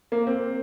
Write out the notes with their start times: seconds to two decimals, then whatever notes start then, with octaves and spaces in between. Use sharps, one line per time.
0.12 A#3
0.27 C4